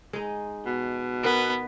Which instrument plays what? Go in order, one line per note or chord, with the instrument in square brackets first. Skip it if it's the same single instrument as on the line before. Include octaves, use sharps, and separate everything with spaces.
[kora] G#3 D#4
[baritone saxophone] B2
[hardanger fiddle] B3 [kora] D#4 A#4 B4